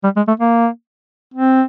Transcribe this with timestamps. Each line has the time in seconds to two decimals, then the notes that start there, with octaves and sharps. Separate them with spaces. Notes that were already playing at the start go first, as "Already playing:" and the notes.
0.03 G3
0.16 G#3
0.28 A3
0.39 A#3
1.34 C4